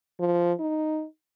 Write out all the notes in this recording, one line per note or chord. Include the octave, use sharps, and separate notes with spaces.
F3
D#4